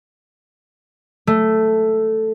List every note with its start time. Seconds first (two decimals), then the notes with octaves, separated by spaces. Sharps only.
1.27 A3